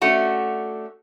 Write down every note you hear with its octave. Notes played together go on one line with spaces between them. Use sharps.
A3 C#4 D4 F#4